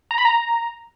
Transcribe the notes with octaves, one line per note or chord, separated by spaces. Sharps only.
A#5
B5
A#5